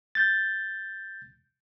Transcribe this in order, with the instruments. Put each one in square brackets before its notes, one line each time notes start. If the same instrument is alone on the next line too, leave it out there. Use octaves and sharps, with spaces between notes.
[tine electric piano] G6 A6